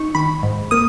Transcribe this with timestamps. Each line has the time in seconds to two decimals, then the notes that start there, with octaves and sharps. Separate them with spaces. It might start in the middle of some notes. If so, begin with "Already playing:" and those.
Already playing: D#4 C#6
0.15 D#3 B5
0.43 G#2
0.71 A#3 D#6